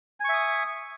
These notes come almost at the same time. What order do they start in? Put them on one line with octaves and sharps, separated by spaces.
G#5 C#6 E5 D#6